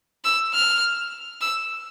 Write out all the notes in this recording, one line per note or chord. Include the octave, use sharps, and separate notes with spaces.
E6
F6
E6